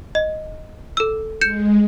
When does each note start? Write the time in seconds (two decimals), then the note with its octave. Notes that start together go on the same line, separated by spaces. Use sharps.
0.15 D#5
0.97 A4 E6
1.41 G#3 G6 C#7 E7